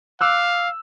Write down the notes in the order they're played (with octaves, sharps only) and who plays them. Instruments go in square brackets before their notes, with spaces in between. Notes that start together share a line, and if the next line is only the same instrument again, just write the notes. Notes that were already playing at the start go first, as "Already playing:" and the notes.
[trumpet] F5 [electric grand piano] D6 E6 F#6